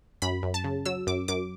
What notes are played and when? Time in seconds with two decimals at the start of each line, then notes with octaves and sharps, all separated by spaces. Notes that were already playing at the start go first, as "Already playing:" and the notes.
0.22 F#2 B5
0.43 F#2
0.54 A5
0.64 C#3
0.85 F#3 E6
1.07 F#2 D6
1.28 F#2 D6